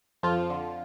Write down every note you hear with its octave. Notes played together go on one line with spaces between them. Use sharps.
F2 F3 F4
D3